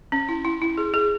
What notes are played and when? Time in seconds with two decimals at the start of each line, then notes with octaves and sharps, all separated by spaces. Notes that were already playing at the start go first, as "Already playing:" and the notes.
0.12 C#4
0.29 E4
0.45 E4
0.62 E4
0.78 G#4
0.94 G#4